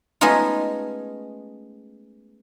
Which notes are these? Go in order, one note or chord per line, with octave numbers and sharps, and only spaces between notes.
G#3 A3 B3 C#4 D#4 F4